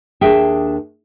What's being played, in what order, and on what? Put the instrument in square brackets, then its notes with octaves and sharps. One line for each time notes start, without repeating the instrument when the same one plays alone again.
[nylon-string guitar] D#2 D4 G#4 E5 G5